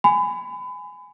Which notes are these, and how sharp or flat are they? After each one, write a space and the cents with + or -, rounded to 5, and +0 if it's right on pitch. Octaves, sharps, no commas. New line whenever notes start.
G#5 +0 B5 +30